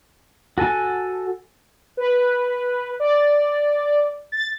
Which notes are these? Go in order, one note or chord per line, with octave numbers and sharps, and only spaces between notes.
F#4 A4 G#5 A5
B4
D5
A6